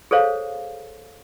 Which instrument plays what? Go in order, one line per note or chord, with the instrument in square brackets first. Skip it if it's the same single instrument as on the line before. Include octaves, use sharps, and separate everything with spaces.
[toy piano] G#4 A4 C5 C#5 F5